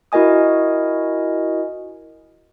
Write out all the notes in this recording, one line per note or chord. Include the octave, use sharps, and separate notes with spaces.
E4 F#4 A#4 D#5 G#5 D#6